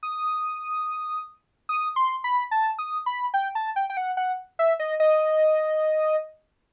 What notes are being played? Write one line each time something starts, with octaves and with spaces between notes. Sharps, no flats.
D#6
D#6
C6
B5
A5
D#6
B5
G5
A5
G5
G5
F#5
F#5
E5
D#5
D#5